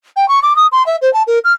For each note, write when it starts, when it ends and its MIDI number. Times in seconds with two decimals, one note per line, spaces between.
0.16 0.27 79
0.28 0.39 85
0.43 0.56 86
0.56 0.67 87
0.72 0.85 84
0.86 0.96 76
1.02 1.12 72
1.13 1.23 81
1.27 1.39 70
1.44 1.53 89